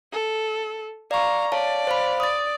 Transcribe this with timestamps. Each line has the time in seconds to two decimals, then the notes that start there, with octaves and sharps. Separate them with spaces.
0.12 A4
1.11 D5 F5 A#5 C#6
1.52 C#5 D5 F5 A5
1.87 C5 F5 B5
2.20 D5 D#6 A6